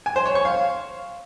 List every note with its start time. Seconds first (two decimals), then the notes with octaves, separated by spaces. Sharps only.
0.06 G#5
0.16 C5
0.26 C#5
0.35 C#6
0.45 F5